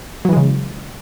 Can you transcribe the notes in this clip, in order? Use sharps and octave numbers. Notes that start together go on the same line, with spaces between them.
C#3 E3 F#3 G#3